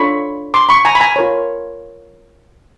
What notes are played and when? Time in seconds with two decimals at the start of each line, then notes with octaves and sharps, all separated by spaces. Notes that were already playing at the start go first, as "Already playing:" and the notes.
Already playing: D4 F4 A4 C#5 B5 C#6
0.54 C6 D6
0.69 B5 C#6
0.85 G#5 A#5
0.95 B5
1.00 G#5 A#5
1.16 F4 A#4 C#5